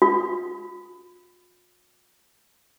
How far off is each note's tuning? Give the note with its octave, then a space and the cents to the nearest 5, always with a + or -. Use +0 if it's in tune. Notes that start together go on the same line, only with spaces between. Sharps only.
F4 +40